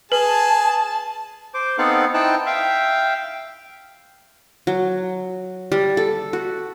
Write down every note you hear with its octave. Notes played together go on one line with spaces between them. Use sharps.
G#4 B4 A5
C5 D6
B3 C4 D#4 A4 F5 F#5
D#4 E4 C5 G5 A5 F#6
E5 F5 G5
F#3
G3
A4
F#4